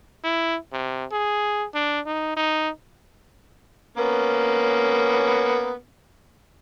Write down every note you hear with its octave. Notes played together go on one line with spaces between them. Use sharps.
E4
C3
G#4
D4
D#4
D#4
A#3 B3 C#4